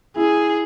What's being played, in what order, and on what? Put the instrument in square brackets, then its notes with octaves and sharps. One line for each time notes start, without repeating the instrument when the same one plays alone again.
[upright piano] E4 [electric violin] G#4